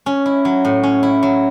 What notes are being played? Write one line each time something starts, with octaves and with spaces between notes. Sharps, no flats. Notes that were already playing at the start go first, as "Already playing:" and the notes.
C#4
E4
F#3
A2
C#4
E4
F#3